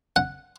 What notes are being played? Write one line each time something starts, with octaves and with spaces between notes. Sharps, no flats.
F#5